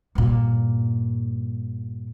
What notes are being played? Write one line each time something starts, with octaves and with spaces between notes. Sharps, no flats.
G2 A#2